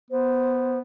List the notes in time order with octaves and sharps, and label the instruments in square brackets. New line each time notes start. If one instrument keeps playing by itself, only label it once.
[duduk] B3 [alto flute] C5